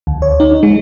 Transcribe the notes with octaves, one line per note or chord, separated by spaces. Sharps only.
D2
C#5
D#4
G#3